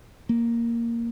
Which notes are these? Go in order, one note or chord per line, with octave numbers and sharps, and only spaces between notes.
A#3